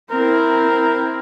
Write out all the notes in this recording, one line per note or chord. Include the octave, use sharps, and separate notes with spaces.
C4 E4 A#4